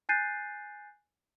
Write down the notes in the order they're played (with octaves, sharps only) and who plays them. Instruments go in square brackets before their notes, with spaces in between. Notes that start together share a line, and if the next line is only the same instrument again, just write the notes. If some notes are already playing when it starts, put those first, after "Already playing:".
[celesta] G#5 F#6 G6 A6 C7 D#7